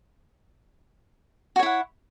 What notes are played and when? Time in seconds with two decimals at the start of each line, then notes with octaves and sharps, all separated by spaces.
1.56 F#4
1.59 C#5
1.63 E4
1.66 F#5